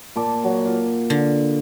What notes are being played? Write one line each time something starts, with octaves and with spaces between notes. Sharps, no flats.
A#2 A5 D6
F#3
F4
D3